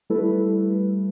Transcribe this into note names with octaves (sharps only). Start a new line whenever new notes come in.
G3 A3 E4 A4 B4